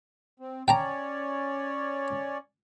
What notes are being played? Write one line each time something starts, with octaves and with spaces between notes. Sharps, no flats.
C4
C#4 C#5 D5 G5 A5 A#5